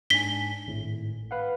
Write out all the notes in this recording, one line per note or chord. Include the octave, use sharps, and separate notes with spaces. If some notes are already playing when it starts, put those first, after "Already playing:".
G#2 D4 G#5 B6 G7
G#1 A2
B4 F5 F#5